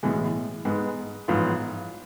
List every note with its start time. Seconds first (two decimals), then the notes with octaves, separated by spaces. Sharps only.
0.03 B1 A2 E3 G#3
0.65 G#2 G#3 B3
1.28 A1 G#2 F3 B3 F4